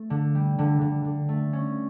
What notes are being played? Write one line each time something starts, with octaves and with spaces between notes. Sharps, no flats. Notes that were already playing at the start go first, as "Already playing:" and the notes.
Already playing: A3
D3
G3
D3
D3
D3
A3
C#4